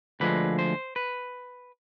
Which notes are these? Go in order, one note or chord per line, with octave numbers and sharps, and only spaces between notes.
D2 D3 F3 G#3 B4
C5
B4